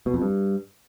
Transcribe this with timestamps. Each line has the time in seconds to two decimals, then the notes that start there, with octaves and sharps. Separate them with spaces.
0.06 B2
0.14 F2
0.22 G2